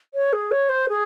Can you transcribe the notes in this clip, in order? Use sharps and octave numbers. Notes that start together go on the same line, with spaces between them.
C#5
G#4
C#5
C5
G#4